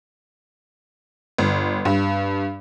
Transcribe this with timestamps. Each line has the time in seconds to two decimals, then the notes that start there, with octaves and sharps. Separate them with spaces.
1.38 G1
1.85 G2